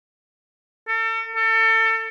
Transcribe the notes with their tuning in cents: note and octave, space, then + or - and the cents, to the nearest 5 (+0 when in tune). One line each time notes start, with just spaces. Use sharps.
A4 +40
A4 +30